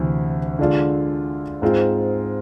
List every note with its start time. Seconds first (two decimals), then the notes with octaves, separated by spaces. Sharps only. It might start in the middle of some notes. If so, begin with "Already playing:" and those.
Already playing: D2 C3 E3
0.59 D3 G#3 D4 F4
1.62 G#2 G#3 C4 F4